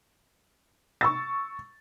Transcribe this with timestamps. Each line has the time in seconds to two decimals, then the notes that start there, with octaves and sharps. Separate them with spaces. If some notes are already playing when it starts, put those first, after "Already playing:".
1.01 C#6 E6 A6